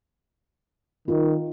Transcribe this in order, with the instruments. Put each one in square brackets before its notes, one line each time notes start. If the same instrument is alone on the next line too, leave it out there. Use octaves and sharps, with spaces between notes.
[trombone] D#3 [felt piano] F4